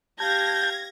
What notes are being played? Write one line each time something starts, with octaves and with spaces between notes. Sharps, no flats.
G4 F5 A5 G6 G#6 A#6